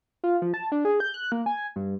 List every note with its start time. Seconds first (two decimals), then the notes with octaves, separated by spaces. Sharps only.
0.24 F4
0.42 F3
0.54 A5
0.72 D4
0.85 G#4
1.00 G6
1.14 F#6
1.32 A#3
1.46 G#5
1.76 G2